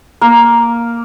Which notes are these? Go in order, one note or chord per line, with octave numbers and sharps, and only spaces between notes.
A#3